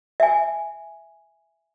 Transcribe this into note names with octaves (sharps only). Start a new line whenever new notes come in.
E5 G#5